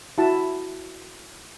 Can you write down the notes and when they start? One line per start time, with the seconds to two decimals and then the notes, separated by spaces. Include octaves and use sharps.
0.18 E4 F#4 E5 A5